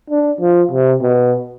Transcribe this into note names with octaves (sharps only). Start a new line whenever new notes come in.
D4
F3
C3
B2